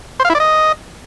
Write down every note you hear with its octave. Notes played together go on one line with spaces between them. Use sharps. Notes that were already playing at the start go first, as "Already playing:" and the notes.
C5
F5
E4
D5
D#5